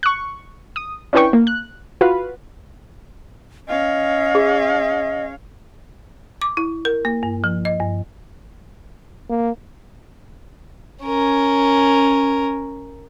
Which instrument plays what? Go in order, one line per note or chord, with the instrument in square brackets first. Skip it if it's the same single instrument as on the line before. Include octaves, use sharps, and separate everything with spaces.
[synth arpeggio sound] C#6 F#6
D#6
C#4 D4 E4 B4 G5 C#6
A#3
F#6
F4 F#4 B4 F5
[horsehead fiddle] C#4 F5 [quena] D#5
[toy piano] G#4
[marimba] D6
E4
A#4
A#3
G2
F3
D#5
G2
[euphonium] A#3
[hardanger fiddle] C#4 A#4